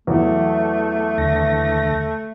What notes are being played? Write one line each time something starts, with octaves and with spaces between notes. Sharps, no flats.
E2 E3 F#3 A3
D#2 D3 A#6